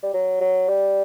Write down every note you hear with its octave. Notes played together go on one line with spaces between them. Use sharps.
G3
F#3
F#3
G3